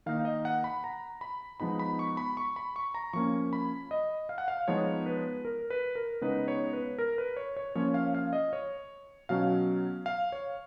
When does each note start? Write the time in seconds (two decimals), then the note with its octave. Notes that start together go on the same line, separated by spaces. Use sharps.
0.06 D#3 A#3 D#4 F5
0.25 D#5
0.45 F#5
0.64 B5
0.84 A#5
1.21 B5
1.60 F3 G#3 B3 D#4 B5
1.79 B5
1.99 C#6
2.17 B5
2.37 C#6
2.56 B5
2.76 C#6
2.94 A#5
3.13 F3 A#3 C#4 C#6
3.53 B5
3.91 D#5
4.29 F5
4.38 F#5
4.48 F5
4.68 F3 G#3 B3 D#4 C#5
5.06 B4
5.45 A#4
5.70 B4
5.95 A#4
6.21 C#3 G#3 B3 D#4 B4
6.48 C#5
6.73 B4
6.98 A#4
7.18 B4
7.37 C#5
7.57 C#5
7.75 F3 A#3 C#4 C#5
7.94 F5
8.15 F5
8.33 D#5
8.53 C#5
9.29 B2 F#3 C#4 F5
10.06 F5
10.32 C#5